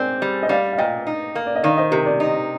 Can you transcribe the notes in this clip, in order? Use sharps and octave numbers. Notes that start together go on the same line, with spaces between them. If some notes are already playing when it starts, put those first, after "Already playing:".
Already playing: G#2 C4 G#4 A#4 D5
G3
D#5
G3 D5 F5
F5
A#2 D#5 G5
D#4
A#3
D5
D#5
D#3 D5 F5
C5 D#5
C3 G4 A#4
A#4 D5
D#4